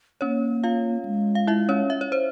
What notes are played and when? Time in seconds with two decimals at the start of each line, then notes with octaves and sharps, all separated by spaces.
0.21 A#3 C#4 C#5
0.64 F4 F5
1.05 G#3
1.35 F5
1.47 E4 E5
1.69 C#4 C#5
1.90 E5
2.01 C#5
2.12 C5